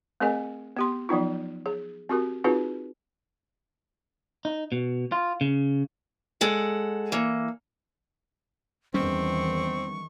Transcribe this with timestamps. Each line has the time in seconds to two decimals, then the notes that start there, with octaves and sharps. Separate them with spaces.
0.20 A3 C4 G#4 A#4 D#5 G#5
0.77 B3 G4 C6
1.09 F3 F#3 B3 D#4 F4
1.66 G#4
2.09 C4 F#4 G4 A#4
2.44 C4 D#4 F4 F#4 G#4 B4
4.45 D#4
4.72 B2
5.12 F4
5.41 C#3
6.41 G#3 A4 F#5
7.12 E3 A#3
8.94 E2 D#3 G3 C4 C#4 C#6